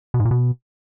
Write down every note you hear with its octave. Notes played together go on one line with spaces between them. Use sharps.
B2
G#2
A#2
B2